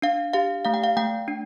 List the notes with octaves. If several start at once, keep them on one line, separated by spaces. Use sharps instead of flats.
D4 F5
G4 F5
A3 F5
G5
F5
A3 G5
D4